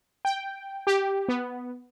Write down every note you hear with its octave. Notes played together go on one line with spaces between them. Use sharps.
G5
G4
B3